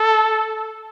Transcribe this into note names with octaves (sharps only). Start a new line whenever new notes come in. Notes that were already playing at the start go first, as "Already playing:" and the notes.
Already playing: A4